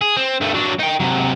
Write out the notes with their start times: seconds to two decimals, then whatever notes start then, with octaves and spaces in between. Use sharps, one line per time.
0.01 G#4
0.17 C4
0.41 G2 A3
0.55 F#3 D4
0.79 D#4 G5
1.00 C3 F#3